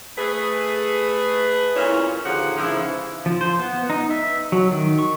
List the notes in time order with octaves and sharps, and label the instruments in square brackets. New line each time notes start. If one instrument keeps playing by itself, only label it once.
[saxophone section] A3 G#4 B4
F2 A#2 A#3 C#4 E4 C#5
D#2 A#2 D3 F3 G#4 F#5
G#2 C#3 E3 F3 E4
[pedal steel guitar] F3
C5
B3
D#4
E5
F#3
D#3
C#6